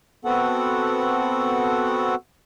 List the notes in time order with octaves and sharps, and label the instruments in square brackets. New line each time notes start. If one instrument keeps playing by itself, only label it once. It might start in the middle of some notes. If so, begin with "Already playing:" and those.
[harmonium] B3 C4 F#4 A4 F#5